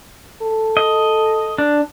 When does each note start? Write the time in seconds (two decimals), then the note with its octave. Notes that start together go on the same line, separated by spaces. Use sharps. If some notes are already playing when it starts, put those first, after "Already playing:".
0.42 A4
0.77 D#5
1.58 D4